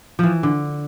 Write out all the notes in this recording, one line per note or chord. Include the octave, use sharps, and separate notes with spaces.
E3 F3
D3